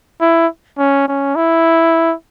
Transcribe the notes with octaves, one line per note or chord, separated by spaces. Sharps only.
E4
C#4
C#4
E4